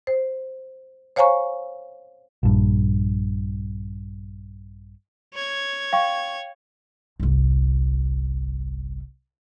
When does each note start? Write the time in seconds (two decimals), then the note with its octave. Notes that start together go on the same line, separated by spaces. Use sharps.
0.07 C5
1.16 C5 C#5 F5 G#5 A#5 C#6
2.43 A#1 G2
5.34 C#5 G#6
5.93 F5 G5 C#6
7.20 G1 C2